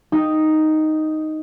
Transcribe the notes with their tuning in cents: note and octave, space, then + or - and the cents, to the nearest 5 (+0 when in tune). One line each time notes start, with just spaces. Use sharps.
D#4 +0 G4 +0